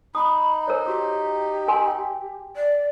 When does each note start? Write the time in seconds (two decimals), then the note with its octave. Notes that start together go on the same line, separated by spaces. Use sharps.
0.15 D#4 B5 D#6
0.68 A#4 C5 C#5
0.86 F#4 G4 D6
1.68 A#4 G#5 C6
1.87 G5
2.55 D5